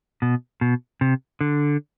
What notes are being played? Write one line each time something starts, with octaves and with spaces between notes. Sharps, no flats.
B2
B2
C3
D3